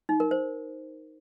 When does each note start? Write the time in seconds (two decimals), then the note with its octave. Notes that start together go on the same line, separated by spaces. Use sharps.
0.09 D#4
0.20 A#4
0.31 C5